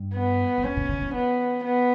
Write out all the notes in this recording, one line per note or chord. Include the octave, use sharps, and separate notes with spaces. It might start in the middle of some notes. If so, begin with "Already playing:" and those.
Already playing: G2
B3
E2
F#2 C#4
B2
C#3
E3
E3 B3
B3